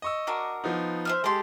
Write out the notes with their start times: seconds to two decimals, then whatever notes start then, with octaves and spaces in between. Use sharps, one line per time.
0.02 D#5 C#6 E6
0.27 D4 F#4 A#4
0.64 F3 B3 D#4
1.05 C5 E5 F6
1.24 G#3 G4 A4 C6